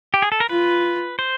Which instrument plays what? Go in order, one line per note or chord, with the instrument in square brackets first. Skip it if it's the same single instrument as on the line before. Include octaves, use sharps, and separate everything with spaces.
[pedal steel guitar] G4
G#4
A4
A#4
[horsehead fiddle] F4 [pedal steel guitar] B4
[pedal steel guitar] C5